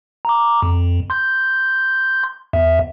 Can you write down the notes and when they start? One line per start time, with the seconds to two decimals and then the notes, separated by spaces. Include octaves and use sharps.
0.25 A#5 D6
0.62 F2
1.10 C6 G6
2.53 E2 E5